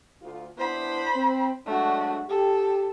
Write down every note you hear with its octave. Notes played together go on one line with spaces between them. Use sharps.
D2 F4
B3 D4 E4 C5 B5
C4
F#3 G#3 A3 D4 F#4
G4 A4